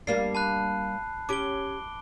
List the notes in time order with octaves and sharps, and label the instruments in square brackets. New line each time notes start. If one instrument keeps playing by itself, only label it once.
[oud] G3 A#3 D4 [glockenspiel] C7
[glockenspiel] A5 B5 F#6
[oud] C#4 G4 [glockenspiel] D6 D7 G7